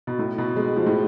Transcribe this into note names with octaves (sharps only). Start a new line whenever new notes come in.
B2
A2
B2
G#3
F3
A2